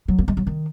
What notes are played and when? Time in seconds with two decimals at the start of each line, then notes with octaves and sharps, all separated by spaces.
0.08 F#3
0.19 A#3
0.28 G#3
0.37 F#3
0.47 D#3